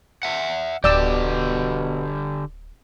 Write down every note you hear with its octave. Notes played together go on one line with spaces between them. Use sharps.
E5 F#5
D1 B2 D3 G4 D5 E6